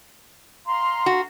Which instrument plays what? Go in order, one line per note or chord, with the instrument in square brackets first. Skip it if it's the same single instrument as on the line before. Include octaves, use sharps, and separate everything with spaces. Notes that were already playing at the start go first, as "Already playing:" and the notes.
[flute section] F5 A#5 C6
[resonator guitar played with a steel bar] F#4